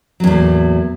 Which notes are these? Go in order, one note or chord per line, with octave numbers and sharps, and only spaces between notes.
E2 A2 F#3 A#3